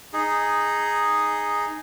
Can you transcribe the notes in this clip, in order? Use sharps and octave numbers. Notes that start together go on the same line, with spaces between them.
D#4 G#4